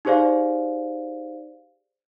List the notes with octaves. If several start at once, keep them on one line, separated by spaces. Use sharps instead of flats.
D#4 G4 G#4 C5 D5 F5